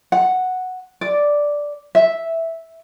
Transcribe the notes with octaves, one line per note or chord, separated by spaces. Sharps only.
F#5
D5
E5